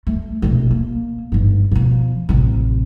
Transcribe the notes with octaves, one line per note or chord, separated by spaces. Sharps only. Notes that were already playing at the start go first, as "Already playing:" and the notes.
A3
E1 A#1
A#3
G1 G#2
B2 F3
A1 C3